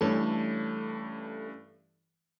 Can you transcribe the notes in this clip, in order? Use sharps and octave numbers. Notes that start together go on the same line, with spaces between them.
G2 E3 A3 C#4 A4